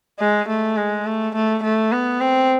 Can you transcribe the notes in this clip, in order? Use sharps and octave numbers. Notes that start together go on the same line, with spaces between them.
G#3
A3
G#3
A3
A3
A3
B3
C4